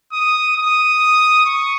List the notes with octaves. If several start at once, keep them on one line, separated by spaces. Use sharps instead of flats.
D#6
D#6
C#6